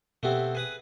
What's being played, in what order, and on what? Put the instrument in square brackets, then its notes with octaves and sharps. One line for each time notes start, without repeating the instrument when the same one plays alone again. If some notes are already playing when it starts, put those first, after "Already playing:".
[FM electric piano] B2 G4 [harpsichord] A3 B3 C4
[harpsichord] G#4 B4 D#6